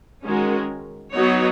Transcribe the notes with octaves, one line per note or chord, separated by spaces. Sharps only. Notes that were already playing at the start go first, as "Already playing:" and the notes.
D#3 G#3 C#4 F#4 A#4
F#3 B3 D#4 F#4 C#5